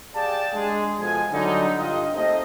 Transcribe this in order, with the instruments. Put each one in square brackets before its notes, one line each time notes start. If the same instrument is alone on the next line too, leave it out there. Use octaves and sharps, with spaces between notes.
[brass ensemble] G4 G#4 D5 F5 G5 A5
G#3 D4 G#4
B2 F3 G#3 A4 G#5
D3 F#3 G3 D#4
G2 D3 F4 G4 D#5
A3 A#3 C4 D#4 E4 D#5